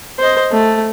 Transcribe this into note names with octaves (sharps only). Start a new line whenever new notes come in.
C5 D#5
A3